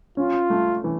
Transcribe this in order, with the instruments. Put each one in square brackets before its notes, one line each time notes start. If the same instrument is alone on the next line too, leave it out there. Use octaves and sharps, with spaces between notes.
[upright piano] C#4 [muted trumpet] F4
[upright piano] A3
E3